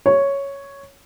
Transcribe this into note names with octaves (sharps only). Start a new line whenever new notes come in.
C#5